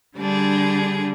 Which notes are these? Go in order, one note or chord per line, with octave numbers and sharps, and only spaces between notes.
D3 G3 D4 G#4